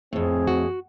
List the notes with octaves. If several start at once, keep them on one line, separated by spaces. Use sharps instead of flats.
F2 A2 C4 G#4
F#4